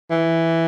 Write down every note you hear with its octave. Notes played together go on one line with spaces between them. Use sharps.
E3